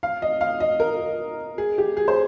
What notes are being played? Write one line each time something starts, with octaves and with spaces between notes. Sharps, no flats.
F5
D#5
F5
D#5
A#4
G#4
G4
G#4
C5